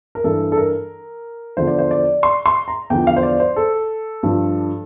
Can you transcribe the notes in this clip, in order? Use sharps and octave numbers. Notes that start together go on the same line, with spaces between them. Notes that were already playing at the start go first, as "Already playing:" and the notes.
A#4
G2 E3 A4
A4
A#4
E2 D3 F3 C5
D5
C5
D5
C6
C6
A#5
E2 D3 F3 G5
F5
C5
D5
C5
A4
G2 F3